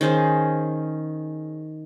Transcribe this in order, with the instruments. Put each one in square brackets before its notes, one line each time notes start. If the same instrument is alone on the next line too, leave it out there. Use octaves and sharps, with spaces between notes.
[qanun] D#3 C#4 G#4 C5